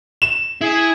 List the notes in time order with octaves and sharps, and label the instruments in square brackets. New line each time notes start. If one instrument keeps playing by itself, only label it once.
[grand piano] E7
[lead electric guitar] E4 [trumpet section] G#4